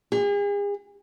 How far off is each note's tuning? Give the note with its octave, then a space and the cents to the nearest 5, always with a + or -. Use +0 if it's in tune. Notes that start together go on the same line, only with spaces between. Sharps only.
G#4 -40